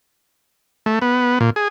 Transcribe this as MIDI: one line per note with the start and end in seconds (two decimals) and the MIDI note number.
0.86 0.99 57
1.02 1.39 59
1.41 1.50 46
1.56 1.68 68